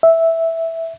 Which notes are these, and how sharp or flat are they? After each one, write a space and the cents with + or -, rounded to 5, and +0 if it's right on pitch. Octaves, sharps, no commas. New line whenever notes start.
E5 -5